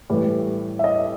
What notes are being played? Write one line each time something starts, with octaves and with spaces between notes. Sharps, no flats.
A2 E3 G3
E5
D#5